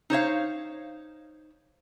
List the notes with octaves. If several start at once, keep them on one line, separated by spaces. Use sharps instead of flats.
D#4 C5 C#5 F5